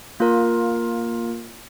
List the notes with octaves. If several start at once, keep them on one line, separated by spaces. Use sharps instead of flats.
A#3 F4 A#4